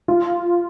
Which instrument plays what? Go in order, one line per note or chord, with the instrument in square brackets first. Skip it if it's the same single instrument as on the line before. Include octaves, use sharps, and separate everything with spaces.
[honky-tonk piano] F4